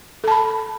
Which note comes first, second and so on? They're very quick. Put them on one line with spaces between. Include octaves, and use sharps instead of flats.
A4 A5 B5